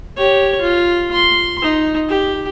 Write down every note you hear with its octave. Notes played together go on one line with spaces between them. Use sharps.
G4 C#5
F4
C6
D#4
G4